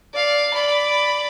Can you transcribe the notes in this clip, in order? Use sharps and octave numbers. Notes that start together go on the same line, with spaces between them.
D5 F5
D5 B5